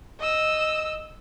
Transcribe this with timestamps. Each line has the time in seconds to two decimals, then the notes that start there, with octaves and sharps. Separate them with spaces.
0.20 D#5 E6